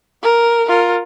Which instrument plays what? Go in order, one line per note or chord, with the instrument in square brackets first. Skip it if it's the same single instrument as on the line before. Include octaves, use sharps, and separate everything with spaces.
[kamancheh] A#4
F4 A#4